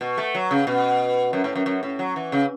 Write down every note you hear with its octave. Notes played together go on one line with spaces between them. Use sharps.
B2
A3
F#3
C#3
B2
F#2
A2
F#2
F#2
A2
F#3
E3
C#3